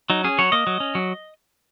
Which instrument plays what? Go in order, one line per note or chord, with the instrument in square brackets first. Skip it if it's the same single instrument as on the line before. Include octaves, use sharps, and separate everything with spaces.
[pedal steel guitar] F#3 D#4
C#4 G#4
F#3 C#5
A#3 D#5
F#3
C#4
F#3